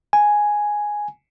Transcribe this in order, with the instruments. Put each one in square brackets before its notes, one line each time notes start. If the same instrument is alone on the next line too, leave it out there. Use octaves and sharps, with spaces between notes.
[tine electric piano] G#5